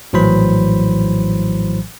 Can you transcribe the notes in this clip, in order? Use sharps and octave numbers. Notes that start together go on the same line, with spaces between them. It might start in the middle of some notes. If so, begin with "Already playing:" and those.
A#1 A2 E3 F#3 C5 B5